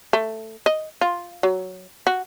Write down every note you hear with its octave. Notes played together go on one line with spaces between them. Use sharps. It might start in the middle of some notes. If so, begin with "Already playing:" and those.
A3
D#5
F4
F#3
F#4